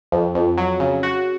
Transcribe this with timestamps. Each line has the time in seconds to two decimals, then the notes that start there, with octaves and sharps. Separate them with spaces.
0.12 F2
0.35 F2
0.58 F#3
0.80 C#3
1.03 F#4